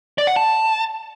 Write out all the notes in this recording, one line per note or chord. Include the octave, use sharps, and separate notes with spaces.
D5
F#5
A5